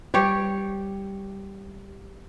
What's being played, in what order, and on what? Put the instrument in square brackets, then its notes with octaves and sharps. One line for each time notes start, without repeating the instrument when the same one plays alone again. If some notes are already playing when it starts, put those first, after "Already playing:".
[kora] G3 G4 C#5